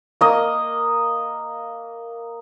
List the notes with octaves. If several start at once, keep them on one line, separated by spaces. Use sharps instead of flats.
A#3 D#5